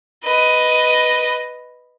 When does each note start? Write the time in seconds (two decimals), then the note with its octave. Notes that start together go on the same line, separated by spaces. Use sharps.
0.24 B4 D#5